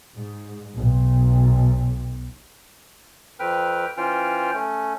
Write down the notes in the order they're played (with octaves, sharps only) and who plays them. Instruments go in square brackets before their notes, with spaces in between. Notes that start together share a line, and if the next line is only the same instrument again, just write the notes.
[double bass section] G#2
B1
[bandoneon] F2 C4 B4 G5 F6
E3 C#4 F4 C5 G5 F6
A3 C#4